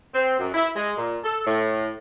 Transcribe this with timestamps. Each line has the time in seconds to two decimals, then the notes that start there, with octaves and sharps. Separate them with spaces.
0.14 C4
0.39 F#2
0.54 E4
0.76 G#3
0.97 A#2
1.24 A4
1.46 A2